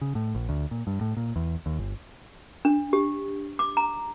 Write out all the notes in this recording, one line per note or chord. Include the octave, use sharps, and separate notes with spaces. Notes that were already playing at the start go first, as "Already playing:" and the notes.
C#3
A2
A#1
D2
A#2
G2
A2
A#2
E2
D#2
G1
D4
G4
D6
A#5